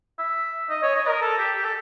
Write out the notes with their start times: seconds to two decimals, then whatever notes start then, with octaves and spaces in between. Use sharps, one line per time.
0.18 E5
0.70 D#5
0.83 C#5
0.96 D#5
1.08 A#4
1.21 A4
1.38 G4
1.56 G4
1.64 A4